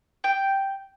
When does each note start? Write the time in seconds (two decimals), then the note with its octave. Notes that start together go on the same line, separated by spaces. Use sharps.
0.24 G5